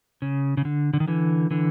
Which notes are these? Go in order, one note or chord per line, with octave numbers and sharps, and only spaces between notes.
C#3
C#3
D3
D3
D#3
D3 E3
D3 E3